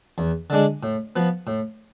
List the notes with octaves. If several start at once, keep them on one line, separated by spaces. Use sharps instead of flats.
E2
D3 G#3 D4
A2
F3 B3
A2